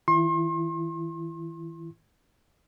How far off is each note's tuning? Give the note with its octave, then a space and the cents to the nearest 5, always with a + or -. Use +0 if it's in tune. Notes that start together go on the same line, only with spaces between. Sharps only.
E3 -45 E4 +30 C6 +40